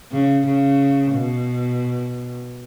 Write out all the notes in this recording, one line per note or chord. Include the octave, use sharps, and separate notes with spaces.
C#3
C#3
B2